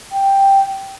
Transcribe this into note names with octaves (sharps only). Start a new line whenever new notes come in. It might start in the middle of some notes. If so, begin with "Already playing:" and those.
G5